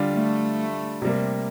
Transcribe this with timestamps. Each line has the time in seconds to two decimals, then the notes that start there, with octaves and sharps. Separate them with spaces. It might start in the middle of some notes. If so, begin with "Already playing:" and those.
Already playing: D3 G3 D4 F4
0.13 A3
1.02 C3 G3 A#3